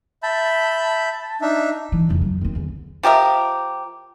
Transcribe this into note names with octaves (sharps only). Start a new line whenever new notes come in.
E5 A5 B5 G6
D4 D#4 E5
E3
F2 C#3
F#3
D#2 C4
E2 D3
F3 G4 A#4 E5